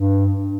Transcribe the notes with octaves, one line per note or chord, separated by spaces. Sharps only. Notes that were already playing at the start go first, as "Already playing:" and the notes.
Already playing: G2